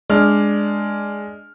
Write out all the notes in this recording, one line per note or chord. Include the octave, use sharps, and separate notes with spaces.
G#3 D4 D5 F6